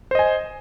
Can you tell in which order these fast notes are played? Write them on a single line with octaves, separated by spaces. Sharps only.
C5 D#5 G#5